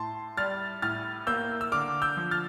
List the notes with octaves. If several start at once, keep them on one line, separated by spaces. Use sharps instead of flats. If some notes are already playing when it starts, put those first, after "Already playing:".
Already playing: A2 A5 C6
G3 F6 A6
A2 F6 A6
A#3 E6 G6
E6
D3 D6 F6
E6 G6
F3
F6 A6